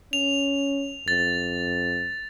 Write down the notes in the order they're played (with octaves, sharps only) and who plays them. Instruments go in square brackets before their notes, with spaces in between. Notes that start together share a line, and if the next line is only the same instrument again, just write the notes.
[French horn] C#4 [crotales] F7
[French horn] F2 [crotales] A6